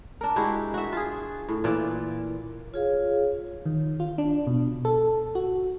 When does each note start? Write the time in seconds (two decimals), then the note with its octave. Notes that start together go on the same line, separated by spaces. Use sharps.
0.21 D4 A#4
0.36 G#3 E4 F#4 G4
0.74 F#4 E5
0.93 F4 G#4
1.49 A2
1.64 A#2 E3 F4 D5
2.74 F4 G#4 C#5 F5
3.66 D#3
4.00 F4
4.18 D4
4.47 B2
4.85 A4
5.35 F#4